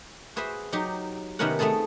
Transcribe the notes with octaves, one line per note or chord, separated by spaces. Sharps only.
F#4 G#4 B4 C5 E5
F#3 D#4 G4
C3 D#3 B3 C#4 A#4 F#5
A3 B3 C4 G#4 A4